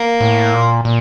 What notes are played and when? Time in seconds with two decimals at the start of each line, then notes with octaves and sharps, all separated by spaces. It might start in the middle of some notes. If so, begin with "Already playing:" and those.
Already playing: A#3
0.21 A2
0.54 A#2
0.85 A#2